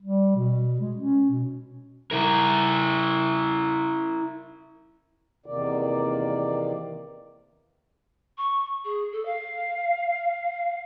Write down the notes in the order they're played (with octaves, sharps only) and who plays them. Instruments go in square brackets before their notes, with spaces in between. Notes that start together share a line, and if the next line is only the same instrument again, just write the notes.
[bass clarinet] G3
B2
G#3
C#4
B2
[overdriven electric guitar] E4 A#4
[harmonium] E2 C3 D#3 A#3 D5
[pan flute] C#6
G#4
A4
F5